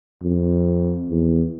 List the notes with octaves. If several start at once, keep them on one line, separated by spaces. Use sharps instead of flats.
F2
E2